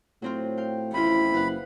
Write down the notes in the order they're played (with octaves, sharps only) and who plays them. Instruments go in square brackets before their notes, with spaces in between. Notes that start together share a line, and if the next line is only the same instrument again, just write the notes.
[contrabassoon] A2 [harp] F#3 C4 F4
[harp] F5 G5
[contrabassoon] A1 [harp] F2 F4 [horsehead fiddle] E4 [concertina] B5
[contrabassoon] F#1 [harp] B4 F5 F#5